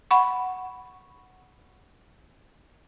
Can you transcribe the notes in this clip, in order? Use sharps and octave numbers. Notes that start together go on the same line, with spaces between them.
F#5 B5 C#6